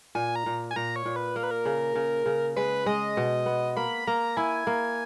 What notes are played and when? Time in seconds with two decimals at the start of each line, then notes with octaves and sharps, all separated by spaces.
0.15 A#2 G#5
0.36 A#5
0.46 A#2
0.71 G#5
0.76 A#2 A#5
0.96 C#5
1.05 A#2
1.16 B4
1.36 A#3 A#4
1.43 B4
1.51 A#4
1.65 C#3
1.96 C#3
2.26 C#3
2.56 G#3 B4
2.86 G#3 D#5
3.17 B2
3.46 B3
3.77 A#3 B5
4.07 A#3 A#5
4.37 E4 G#5
4.67 A#3